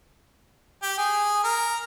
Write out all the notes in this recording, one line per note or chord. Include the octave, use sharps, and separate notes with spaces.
G4
G#4
A#4